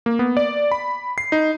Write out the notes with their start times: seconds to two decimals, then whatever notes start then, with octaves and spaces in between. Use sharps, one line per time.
0.06 A#3
0.19 B3
0.37 D5
0.71 B5
1.18 C7
1.32 D#4